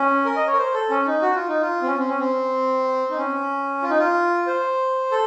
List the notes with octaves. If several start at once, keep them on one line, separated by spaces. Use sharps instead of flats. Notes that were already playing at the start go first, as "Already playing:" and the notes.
Already playing: C#4
A#4
D#5
C#5
A#4
C5
A4
C#4
D#4
F#4
F4
D#4
F4
C4
C#4
C4
C#4
C4
D#4
C#4
F4
D#4
F4
C5
A4